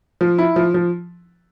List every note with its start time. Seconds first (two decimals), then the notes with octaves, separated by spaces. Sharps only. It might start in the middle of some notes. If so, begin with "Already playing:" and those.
0.21 F3
0.38 E4
0.56 F3
0.74 F3